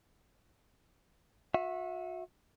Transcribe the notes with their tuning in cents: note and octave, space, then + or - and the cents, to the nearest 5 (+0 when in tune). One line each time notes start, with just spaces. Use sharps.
F#4 -35 E5 +0